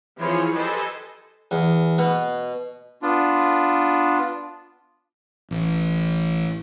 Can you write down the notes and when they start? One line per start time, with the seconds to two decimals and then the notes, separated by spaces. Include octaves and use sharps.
0.17 E3 F3 C4 G#4 C#5
0.55 G4 A4 B4 C5 D#5 G#5
1.51 E2
1.98 B2
3.02 B3 D4 F4
5.51 A1